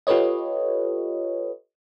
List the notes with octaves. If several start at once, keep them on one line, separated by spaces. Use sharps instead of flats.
F4 G4 A4 B4 C#5 D#5